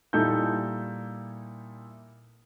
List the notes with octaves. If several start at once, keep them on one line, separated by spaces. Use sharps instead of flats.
A#2 G3 D#4 E4 A4 G6